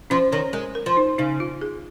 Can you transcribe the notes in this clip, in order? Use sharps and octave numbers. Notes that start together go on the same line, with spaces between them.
F3 C#4
D#3 C#5
G#3 A#4
A#4
F3
D#4
C#3 D#4
F4
G#4